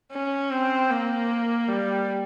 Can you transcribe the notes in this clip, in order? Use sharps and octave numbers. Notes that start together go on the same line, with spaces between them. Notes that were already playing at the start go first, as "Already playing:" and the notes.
C#4
C4
A#3
G3